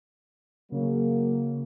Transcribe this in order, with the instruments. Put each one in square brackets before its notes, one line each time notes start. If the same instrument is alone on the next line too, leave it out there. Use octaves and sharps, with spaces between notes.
[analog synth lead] C#3 [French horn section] F#3 A#3